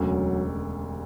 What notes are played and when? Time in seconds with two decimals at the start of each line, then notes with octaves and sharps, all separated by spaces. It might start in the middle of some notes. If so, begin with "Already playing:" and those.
Already playing: E1 D2 C#3 F#3
0.45 G3